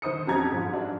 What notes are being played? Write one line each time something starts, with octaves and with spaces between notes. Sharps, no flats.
D#3 C5 D#6 C#7
F2 F#3 C#4 G4 A#5 G#6
G#2 F3
G2 F#3 D4